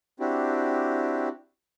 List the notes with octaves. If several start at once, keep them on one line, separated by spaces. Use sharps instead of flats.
C4 D4 E4 F#4 G4